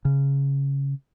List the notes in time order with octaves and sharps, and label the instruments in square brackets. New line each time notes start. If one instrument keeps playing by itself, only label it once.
[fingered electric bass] C#3